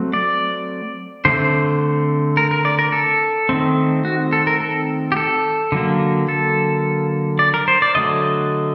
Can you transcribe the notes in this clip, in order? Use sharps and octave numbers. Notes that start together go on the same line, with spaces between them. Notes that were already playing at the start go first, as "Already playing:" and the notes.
Already playing: F#3 A3 C4
D5
D3 A3 C4 C5
A#4
A#4
D5
A#4
A4
D#3 A3 C4
F#4
A4
A#4
A4
G4
A4
D3 F#3 A#3
A4
D5
A#4
C5
D5
D3 F#3 A3 D#5